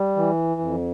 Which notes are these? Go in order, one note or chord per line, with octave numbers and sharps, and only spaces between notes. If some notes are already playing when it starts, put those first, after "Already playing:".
Already playing: G3
E3
F2